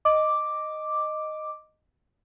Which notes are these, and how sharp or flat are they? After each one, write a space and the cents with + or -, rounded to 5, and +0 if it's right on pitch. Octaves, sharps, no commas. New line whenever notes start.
D#5 -5 D6 +0